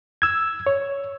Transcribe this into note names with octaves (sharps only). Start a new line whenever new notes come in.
E6 G#6
C#5